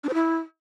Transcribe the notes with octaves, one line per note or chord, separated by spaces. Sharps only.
D4
C5
E4